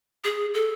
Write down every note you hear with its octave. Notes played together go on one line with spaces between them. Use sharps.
G#4
A4